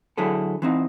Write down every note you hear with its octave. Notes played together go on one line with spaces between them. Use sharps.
D3 F#3 E4 G#4 A4
E3 C4 D#4